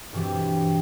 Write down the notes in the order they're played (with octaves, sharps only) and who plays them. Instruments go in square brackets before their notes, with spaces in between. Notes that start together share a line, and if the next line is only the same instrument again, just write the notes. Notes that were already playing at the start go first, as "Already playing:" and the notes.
[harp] G2 B2 E3 C4 G4